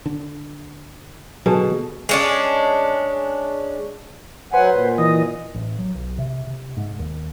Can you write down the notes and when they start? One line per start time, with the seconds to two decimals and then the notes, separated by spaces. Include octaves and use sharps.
0.06 D3
1.46 B2 D3 F#3 G#4 A4 A5
2.09 G#3 C#4 D4
4.53 F#3 B4 C5 F#5 G#5
4.72 A#2
4.98 E3 D#5
5.54 A1
5.78 F#3
5.94 B1
6.18 C3
6.47 C3
6.77 G#2
6.99 D#2